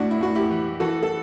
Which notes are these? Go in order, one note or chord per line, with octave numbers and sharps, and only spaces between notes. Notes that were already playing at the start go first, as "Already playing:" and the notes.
Already playing: A2 D4 F#4
E4
A2 F#4
E4 G4
E3
E3 F#4 A4
A4